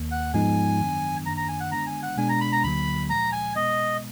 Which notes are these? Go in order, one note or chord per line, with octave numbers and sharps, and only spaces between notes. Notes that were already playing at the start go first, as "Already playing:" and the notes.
Already playing: D#2 D#3 A#3
F#5
G#2 F3 G#3 B3 D#4 G#5
F#2 D#3 F#3 B3 D4
F#2 D#3 A#3 D4 A#5
A#5
G#5
F#5
D3 G#3 B3 D4 A#5
G#5
F#5
B2 G#3 B3 D4 G#5
A#5
B5
A#5
D2 D3 F#3 A#3 B5
A#2 F3 G#3 A#5
G#5
B2 G#3 B3 D#5